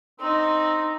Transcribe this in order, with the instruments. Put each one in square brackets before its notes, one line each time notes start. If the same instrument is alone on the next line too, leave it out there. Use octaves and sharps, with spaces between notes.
[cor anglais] C4 [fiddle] D#4